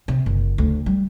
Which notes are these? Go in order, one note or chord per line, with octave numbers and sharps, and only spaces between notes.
C3
F#1
D2
G3